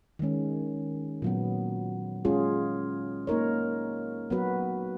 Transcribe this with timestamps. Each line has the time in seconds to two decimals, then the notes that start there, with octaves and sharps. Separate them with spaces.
0.19 D#3 G#3 C#4
1.22 A#2 F#3 B3
2.25 G#3 C#4 F4 G#4
3.27 A#3 D#4 A#4 C#5
4.30 F#3 B3 F#4 B4